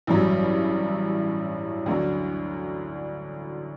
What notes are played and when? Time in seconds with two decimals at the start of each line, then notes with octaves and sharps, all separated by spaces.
0.07 A1 G2 F#3
1.86 D2 D3 F#3